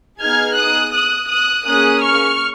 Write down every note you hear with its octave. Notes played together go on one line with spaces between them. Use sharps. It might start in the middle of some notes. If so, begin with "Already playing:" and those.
B3 D#4 G#4 F6 G#6
D#6 F#6
D#6 F#6
D#6 F#6
A#3 C#4 G#4 D#6 F#6
C#6 F6